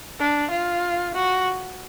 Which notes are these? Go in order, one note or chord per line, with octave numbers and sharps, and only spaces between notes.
D4
F4
F#4